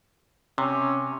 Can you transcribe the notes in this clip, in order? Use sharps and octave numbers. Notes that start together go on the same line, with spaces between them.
C3 C#4